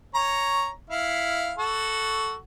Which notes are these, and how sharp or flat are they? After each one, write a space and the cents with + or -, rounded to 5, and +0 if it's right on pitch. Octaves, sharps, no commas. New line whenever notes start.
C#5 +0 A#5 +0
E4 +0 F5 +0
F#4 +5 A4 +0